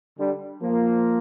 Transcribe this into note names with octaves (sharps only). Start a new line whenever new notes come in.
D3 G3
F3 A#3